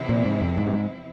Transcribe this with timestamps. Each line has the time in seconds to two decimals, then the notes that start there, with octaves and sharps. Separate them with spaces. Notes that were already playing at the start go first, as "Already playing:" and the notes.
Already playing: E2 C3 F3 C4 E4
0.09 A#2
0.25 G#2
0.41 F2
0.57 G#2
0.67 G2
0.73 G#2